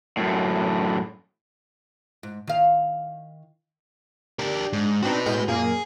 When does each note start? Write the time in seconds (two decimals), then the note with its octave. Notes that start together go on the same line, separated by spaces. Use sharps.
0.17 F#2 A2
2.23 G#2
2.47 D#3 F5
4.39 D4 G4 A#4
4.73 G#2
5.03 C4 D4 D#4 F#4 B4
5.26 A2 G#3 G6
5.48 F#2 A#2 A#3 G#4